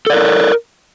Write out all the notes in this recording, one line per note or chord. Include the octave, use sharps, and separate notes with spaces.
A4 A#4 D5